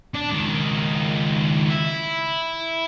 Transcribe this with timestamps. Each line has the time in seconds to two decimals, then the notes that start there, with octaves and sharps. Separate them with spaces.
0.14 D4
0.30 C#2 D#3
1.69 E4